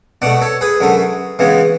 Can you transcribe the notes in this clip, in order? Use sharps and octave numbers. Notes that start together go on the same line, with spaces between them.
B2 A3 D5 F#5
A4 C#5
G#4 B4
F#2 D3 A3
C#3 E3 G#3 B3